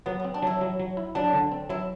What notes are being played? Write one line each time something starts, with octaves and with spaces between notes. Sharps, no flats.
F#3 B3
B3
C4
D4
F#3 E4
F#3
F#3
E4
F#3 D4
D3
C4
F#3 E4